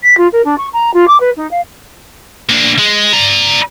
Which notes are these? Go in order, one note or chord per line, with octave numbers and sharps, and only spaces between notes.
B6
F4
A#4
D4
C#6
A#5
F4
D6
B4
D#4
F5
A#3 D4
G#3
D5 A#5